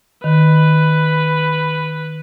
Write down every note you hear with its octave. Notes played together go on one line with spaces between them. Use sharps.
D#3 B4